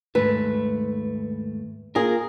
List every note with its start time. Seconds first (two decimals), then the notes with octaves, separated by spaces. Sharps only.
0.15 D#2 G#2 A3 B4
1.95 A#3 F4 G#4 A#4